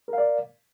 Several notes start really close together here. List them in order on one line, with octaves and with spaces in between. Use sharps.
A#4 F5 D5